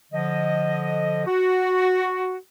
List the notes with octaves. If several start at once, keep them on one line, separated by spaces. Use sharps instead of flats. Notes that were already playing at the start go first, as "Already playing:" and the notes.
D3 F3 D#5
F#4